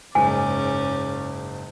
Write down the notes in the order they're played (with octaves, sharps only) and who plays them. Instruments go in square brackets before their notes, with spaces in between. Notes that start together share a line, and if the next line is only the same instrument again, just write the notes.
[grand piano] F#1 G#2 [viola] C#4 D5 [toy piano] G#5